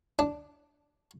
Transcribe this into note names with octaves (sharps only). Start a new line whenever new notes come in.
D4